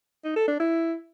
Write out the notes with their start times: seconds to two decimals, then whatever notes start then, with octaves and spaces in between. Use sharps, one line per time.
0.24 D#4
0.36 A4
0.48 D4
0.60 E4